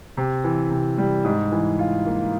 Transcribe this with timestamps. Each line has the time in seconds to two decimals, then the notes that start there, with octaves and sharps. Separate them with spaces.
0.17 C3
0.44 E3
0.71 C3
0.98 G3
1.24 G#2
1.52 E3
1.79 F4
2.06 A#3